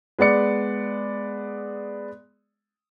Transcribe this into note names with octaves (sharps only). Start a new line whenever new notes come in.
G#3 B3 D5 C#7